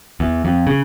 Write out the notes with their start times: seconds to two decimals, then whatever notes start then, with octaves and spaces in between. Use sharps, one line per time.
0.20 E2
0.45 F2
0.67 C#3